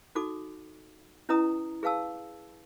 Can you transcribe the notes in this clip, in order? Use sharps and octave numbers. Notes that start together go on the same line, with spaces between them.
D#4 F#4 A4 D6
C#4 E4 B4 D#5 A#5 D#6
G#4 B4 F5 A5 E6